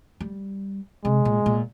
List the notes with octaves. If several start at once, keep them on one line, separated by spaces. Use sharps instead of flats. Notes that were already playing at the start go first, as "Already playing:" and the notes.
G3
C3 G#3
A#2
A#2